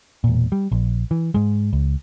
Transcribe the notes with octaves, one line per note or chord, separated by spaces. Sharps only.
E1 A#2
G3
A#1
E3
G#2 G#3
C#2